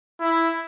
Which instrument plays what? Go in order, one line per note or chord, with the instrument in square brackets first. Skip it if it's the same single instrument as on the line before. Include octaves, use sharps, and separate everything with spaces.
[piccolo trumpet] E4